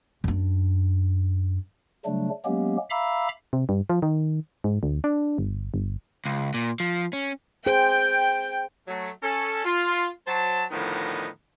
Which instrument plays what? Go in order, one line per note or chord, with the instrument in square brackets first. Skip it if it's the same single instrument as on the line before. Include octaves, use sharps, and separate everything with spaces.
[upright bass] F#2 D4
[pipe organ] C#3 F#3 G3 A3 D4
F#3 G#3 A#3 B3 C#4 G4
E5 F5 A#5 B5 D6 E6
[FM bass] C3
G2
F3
D#3
G#2
D2
D4
G1
G1
[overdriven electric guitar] C#2
A#2
F3
C#4
[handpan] G#4 C5 [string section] G5
[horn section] F#3 A3
C#4 A4
F4
F#3 C5 A5
A2 D3 D#3 F3 B3 D#4